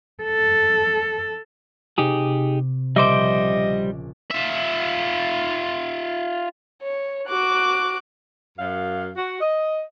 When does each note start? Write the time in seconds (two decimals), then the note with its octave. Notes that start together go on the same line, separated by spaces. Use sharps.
0.23 A4
1.98 C3 D#4 G4 G#4
2.96 A#1 C#3 G3 C5 D#5 E5 D6 D7
4.31 F4 E5
6.82 C#5
7.27 F#4 D6 F#6
8.58 F#2 F5
9.16 F#4
9.41 D#5